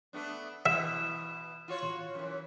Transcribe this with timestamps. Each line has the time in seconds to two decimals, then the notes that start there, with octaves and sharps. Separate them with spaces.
0.13 A3 B3 D4
0.66 B2 E3 E5 E7
1.68 F4 F#4 C#5
2.15 F#2 E3